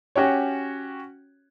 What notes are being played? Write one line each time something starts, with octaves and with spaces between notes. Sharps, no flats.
C#4 F#4 G4 C#5